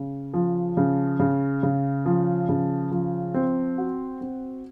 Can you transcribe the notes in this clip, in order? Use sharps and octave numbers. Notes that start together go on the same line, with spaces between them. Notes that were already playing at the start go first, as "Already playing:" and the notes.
Already playing: C#3
F3
C#3
C#3
C#3
F3
C#3
F3
C4
F#4
C4